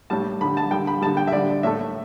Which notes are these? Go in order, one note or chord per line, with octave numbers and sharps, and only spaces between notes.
A2 G3 A5
D3 G3 B5
A5
D3 G3 G5
B5
G3 A5
D3
G5
E5
D3 G3 D5
A2 A3 E5